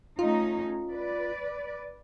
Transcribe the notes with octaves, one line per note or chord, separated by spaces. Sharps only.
A3 C#4 D#4 F4
B4 D5